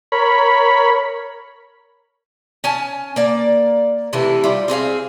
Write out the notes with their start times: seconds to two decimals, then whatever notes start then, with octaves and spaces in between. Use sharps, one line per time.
0.12 A#4 C#5 B5
2.64 C#4 G#5 A5
3.16 A#3 D5
4.13 C3 E3 A3 E4
4.44 G3 F4
4.68 C4 G#4 C#5 F5